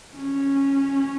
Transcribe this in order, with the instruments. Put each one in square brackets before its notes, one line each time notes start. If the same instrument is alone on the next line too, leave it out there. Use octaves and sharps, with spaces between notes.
[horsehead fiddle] C#4